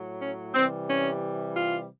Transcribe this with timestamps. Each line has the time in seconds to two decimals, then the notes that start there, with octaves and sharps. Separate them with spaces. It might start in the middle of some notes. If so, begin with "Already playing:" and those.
Already playing: A2 F#3
0.21 C#4
0.54 C3 E3 G3 C4
0.89 C#4
1.56 F4